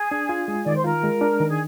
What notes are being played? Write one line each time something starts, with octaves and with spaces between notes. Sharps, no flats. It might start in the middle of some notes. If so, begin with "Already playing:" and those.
Already playing: G#4
D4
F4
G#3
D#3 D5
C5
F4 A#4
G#3
D4
D#3
G#4